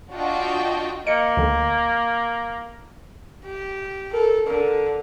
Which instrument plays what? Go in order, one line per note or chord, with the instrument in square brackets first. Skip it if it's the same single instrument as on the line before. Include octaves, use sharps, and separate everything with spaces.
[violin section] D4 F4 F#4 D#5 G5 A5
[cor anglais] A#3 [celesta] D#5 [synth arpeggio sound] C#7
[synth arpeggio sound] D2 D3
[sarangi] G4
[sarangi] A4 [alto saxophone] A#4
[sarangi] D3 [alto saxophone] A#4